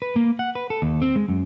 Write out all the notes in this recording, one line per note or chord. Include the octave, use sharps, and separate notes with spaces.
B4
A#3
F#5
B4
A4
D#2
C4
G#3
F#2